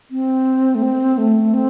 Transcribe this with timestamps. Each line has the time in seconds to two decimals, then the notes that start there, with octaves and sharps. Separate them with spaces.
0.11 C4
0.75 A3
0.83 C4
1.18 A3
1.54 C4